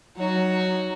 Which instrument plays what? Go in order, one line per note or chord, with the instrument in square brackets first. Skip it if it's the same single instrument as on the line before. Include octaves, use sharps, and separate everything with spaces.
[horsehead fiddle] F#3 D#4 [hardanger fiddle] F#4 C#5